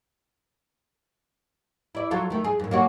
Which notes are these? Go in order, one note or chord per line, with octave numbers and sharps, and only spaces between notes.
E4 D5
F#3 F4 A4
D#3 A3
G#4
G2 A#2
A#3 C#4 F#4